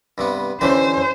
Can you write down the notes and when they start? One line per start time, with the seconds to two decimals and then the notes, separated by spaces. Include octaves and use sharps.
0.18 G2 C3 B3
0.61 D3 E3 C#4 G4 C5